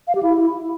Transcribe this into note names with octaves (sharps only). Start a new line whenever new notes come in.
F5
G4
E4